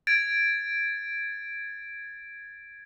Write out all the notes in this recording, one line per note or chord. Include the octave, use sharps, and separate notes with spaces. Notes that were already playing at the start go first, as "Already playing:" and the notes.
G#6 A6 D7